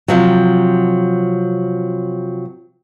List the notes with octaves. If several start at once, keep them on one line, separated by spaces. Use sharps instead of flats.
C3 F3 F#3